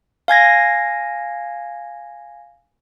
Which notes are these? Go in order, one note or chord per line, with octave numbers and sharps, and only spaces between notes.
F5 G#5 G#6 A#6